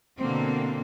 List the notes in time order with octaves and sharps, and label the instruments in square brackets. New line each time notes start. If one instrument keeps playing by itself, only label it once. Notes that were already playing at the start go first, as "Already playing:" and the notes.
[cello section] B2 D3 A#3 C4